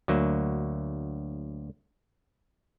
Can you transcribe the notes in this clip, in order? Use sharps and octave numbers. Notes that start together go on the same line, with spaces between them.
D2 F#3 A#3